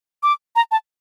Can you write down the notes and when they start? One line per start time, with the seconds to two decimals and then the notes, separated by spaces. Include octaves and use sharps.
0.23 D6
0.56 A#5
0.71 A5